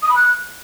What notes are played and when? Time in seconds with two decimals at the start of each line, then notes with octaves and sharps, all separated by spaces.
0.02 D#6
0.09 B5
0.16 F#6